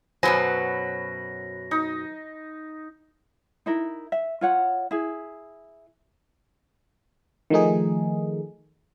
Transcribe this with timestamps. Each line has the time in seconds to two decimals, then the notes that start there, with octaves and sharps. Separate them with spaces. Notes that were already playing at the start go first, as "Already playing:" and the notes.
0.23 F#2 B2 F#3 B4 C5 G#5 B5 A#6
1.71 D#4
3.66 D#4 E4 A#4
4.12 E5
4.41 F4 C#5 F#5
4.91 E4 G#4
7.50 D#3 F3 A3 D#4 G#4